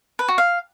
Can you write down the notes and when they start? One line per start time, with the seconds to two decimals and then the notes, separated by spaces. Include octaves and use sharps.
0.19 B4
0.28 F#4
0.38 F5